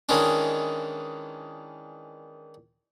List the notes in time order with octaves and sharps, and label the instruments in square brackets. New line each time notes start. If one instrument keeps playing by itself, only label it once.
[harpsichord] D#3 E3 G#3 C#4 D4